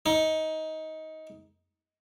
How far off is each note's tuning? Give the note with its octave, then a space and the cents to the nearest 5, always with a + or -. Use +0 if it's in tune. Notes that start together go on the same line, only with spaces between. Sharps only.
D#4 +20